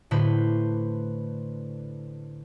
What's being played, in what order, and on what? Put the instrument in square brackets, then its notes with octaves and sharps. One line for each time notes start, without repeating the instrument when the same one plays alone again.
[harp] A2 D3 B4 C5